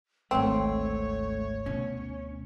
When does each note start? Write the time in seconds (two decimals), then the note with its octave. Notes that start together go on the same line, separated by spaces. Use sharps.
0.31 G#1 D2 A3 C4 C#5
1.66 D2 B2 C#4